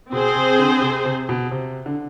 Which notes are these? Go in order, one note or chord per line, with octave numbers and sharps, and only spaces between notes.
B2 C4 G#4 C5
C3
D3
C3
C3
B2
C3
D3